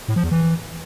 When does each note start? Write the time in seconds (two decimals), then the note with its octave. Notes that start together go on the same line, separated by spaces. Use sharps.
0.08 A2
0.16 F3
0.24 E2
0.31 E3